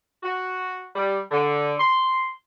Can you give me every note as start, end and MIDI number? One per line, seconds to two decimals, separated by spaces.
0.23 0.85 66
0.95 1.18 55
1.31 1.73 50
1.78 2.29 84